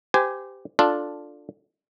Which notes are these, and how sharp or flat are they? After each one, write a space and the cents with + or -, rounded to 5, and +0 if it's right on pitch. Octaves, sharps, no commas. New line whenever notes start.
G4 +0 C5 -35 G#5 +0
D4 +0 F4 +5 A4 +0